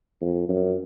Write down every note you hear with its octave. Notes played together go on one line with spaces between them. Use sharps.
F2
F#2